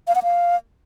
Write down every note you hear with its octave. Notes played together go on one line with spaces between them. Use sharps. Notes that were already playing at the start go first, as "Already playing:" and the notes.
F5
F#5
F5